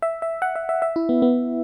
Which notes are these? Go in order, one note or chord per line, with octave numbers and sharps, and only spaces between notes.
E5
E5
F#5
E5
E5
E5
E4
B3
B3